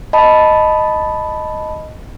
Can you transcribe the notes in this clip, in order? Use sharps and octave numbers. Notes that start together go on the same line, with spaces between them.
D#5 A5 B5